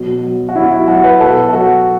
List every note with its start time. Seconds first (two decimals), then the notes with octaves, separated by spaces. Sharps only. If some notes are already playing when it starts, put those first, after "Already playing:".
Already playing: B2 F#3
0.23 F#3
0.49 F#4
0.56 F#3 E4
0.71 F#4
0.88 F#3 F#4
1.04 B4
1.20 B2 A4
1.49 A4
1.52 F#3 F#4